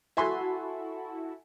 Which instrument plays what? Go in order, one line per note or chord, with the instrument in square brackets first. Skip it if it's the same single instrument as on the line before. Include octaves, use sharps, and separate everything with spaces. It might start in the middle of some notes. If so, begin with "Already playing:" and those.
[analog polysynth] E4 F#4 A4 [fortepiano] E5 G#5 C6